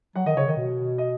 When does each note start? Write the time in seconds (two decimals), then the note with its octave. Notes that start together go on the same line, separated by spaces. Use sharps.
0.16 F#3 F#5
0.26 D#3 D#5
0.36 C#3 C#5
0.47 D#3 D#5
0.57 B2
0.98 D#5